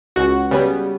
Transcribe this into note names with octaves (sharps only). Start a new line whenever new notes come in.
C#2 F#4
C#3 G3 B3